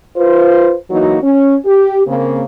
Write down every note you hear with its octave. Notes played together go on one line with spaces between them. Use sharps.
F4 B4 C5
E3 F#3 A#3 D#4 F#4
C#4
G4
C#3 A#3 C4